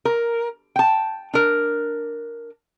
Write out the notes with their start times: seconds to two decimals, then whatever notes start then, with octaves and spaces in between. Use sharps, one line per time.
0.05 A#4
0.76 G5 A5
1.33 D4 A#4